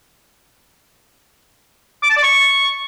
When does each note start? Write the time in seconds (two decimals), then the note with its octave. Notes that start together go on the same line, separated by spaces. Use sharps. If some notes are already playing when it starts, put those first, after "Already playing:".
2.03 D6
2.10 A5
2.16 D5
2.23 C#6